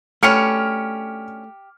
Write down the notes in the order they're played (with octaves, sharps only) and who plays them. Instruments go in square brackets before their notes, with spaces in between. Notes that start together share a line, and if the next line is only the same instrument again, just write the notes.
[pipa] B2 D3 C#4 [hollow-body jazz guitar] A3 [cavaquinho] G4 [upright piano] F6 C#7 F7